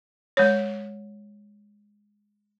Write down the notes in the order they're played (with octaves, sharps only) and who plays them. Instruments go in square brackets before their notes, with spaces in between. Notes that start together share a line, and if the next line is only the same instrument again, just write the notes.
[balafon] G#3 C#5